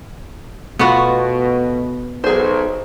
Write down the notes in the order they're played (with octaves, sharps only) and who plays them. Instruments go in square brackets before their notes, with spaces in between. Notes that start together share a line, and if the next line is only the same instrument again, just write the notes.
[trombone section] B2 [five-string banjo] A3 [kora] B3 F4 F#4
[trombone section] B1 [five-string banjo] G#4 C5